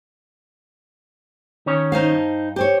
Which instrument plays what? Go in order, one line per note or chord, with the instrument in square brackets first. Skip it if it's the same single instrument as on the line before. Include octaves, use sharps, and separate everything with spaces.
[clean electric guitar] D#3 C#4 C#5
[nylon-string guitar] D#4 C5 F5
[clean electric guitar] G2
[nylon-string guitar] G4 C5 C#5